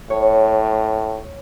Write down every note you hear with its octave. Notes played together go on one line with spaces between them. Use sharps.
A2 C#5